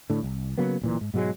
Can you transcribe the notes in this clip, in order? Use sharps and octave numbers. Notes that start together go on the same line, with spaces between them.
A2 D3
C2
C#3 F#3 A#3 B3
D1 A#2 E3
G#2
G#2 B2 F#3 G#3